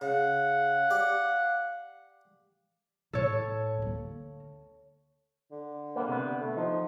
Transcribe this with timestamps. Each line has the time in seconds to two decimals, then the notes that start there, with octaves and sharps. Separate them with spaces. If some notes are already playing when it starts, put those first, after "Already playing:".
0.01 C#3 F5 F#5
0.90 G4 D5
3.13 A2 A4 C#5
3.78 D2 A#3
5.52 D3
5.96 A#3 B3
6.08 C3 B3
6.41 A3
6.57 F3 D#4